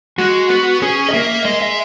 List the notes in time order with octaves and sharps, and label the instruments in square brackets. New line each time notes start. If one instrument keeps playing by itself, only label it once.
[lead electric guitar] G#3 [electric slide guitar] F#4
[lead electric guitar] B3
[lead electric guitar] C#4 [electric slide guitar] G#4
[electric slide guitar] D#5
[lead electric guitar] A#3 [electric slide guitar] E5
[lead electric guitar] G#3 [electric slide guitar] D#5
[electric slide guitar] E5